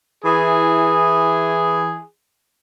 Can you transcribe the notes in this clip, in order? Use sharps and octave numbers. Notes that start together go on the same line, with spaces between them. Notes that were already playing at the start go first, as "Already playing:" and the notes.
E3 E4 G#4